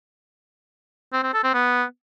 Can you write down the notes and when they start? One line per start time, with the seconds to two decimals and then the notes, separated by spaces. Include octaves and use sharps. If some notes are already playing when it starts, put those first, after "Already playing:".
1.13 C4
1.23 C4
1.33 A4
1.44 C4
1.54 B3